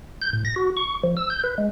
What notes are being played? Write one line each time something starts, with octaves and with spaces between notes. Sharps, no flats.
G6
A2
A#6
F#4
C#6
F3
E6
G6
B4
G#3